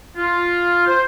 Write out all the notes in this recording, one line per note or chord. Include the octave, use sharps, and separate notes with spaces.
F4
C5